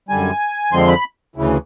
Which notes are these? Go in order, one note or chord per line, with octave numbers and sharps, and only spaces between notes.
F#2 D3 G3 G#5
F2 D3 F3 G#3 C4 C6
B5
D2 C#3 E3